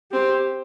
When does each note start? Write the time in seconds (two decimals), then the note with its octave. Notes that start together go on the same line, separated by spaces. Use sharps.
0.12 C4 G4